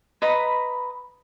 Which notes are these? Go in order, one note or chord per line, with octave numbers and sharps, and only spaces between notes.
B4 D#5 A#5 B5